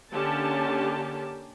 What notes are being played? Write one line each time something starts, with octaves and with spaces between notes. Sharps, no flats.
D3 A#3 C#4 G4 A5